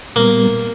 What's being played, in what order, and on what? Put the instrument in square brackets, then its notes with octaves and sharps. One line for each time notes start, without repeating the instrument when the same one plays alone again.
[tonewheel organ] A#2 G3 B3 [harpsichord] A#3